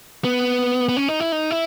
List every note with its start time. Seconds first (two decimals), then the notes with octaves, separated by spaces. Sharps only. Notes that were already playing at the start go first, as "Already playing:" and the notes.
0.24 B3
0.89 B3
0.97 C#4
1.08 D#4
1.20 E4
1.32 D#4
1.51 E4